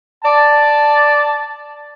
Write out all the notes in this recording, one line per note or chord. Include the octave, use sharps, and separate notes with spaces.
D5 A5